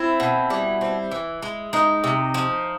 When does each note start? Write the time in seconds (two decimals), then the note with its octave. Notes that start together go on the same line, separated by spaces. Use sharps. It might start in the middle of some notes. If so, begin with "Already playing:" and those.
Already playing: C4 E4
0.20 B2
0.50 G3
0.81 C4
1.11 E3
1.42 G#3
1.73 G#3 D#4
2.04 C3
2.34 F3